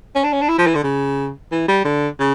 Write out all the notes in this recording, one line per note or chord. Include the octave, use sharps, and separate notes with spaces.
C#4
D4
C#4
D4
E4
F3
E3
D3
C#3
E3
G3
D3
C#3